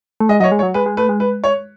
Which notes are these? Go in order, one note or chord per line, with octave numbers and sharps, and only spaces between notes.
A3
G#3 D#5
F#3 D#5
C#5
G#3
C#5
F#3
G#3 B4
G#3
A3 B4
G#3
B4
C#5